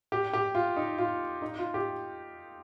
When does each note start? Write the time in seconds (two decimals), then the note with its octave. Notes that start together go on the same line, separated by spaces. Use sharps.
0.12 G4
0.33 G4
0.55 F4
0.76 D#4
0.98 F4
1.42 D#4
1.58 F4
1.74 G4